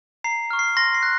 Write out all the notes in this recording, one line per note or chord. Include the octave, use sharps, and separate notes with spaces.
A#5 C7
C#6 F6
C7
C6 A#6
C7
F#6